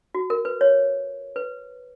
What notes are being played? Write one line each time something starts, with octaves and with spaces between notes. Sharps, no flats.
F#4
A#4
B4
C#5
B4